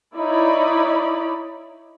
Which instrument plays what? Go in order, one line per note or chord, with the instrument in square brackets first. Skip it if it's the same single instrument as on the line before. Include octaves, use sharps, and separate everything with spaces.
[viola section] D#4 E4 C#5 D5 B5